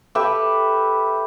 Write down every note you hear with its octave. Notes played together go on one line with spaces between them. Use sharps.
G4 A4 B4 E5